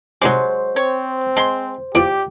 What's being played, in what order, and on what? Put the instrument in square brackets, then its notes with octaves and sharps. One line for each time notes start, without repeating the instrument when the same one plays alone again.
[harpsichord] G#2 C3 D5 [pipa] F#3 G#3 [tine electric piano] C5
[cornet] C4 [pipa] C#5
[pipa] G#3 C6 [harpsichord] A5
[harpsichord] E2 F3 [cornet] G4 [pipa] D5